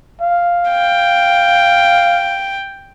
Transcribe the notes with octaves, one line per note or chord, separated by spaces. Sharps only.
F5
G5